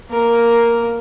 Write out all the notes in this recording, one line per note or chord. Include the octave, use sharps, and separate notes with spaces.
A#3 A#4